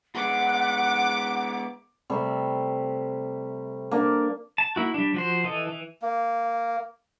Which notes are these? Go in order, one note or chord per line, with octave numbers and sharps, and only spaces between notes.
G#3 B3 F#5 D6
C3 G3 A3
A#3 D4
A5
A#3 E4 F#4
G3 D4
F3 F#4 C5
E3 A4 D#5
E3
A#3